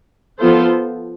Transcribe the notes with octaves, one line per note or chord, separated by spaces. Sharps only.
F3 B3 F4 A4 C5